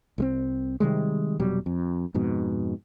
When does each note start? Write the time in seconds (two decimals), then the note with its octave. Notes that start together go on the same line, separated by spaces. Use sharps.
0.18 C2 G#3 C4
0.80 C3 D#3 G3 G#3
1.40 F1 B2 F#3 G3
1.66 F2
2.14 F2 G#2 B2